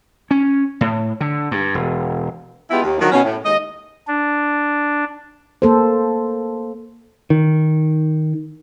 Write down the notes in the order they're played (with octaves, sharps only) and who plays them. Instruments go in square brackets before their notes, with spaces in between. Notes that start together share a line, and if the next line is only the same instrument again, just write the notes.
[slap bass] C#4
A2
D3
G2
E1
[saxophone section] G#3 B3 E4 F4 G4
D#2
D3 D#3 F3 F#3 F#4
B2 C#4
A2
D#2 G#3 D#5
[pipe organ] D4
[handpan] A#3 A4 C5
[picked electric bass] D#3